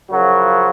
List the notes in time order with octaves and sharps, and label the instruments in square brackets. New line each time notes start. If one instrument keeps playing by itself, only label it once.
[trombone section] F#2 C#3 F3 F#3 F#4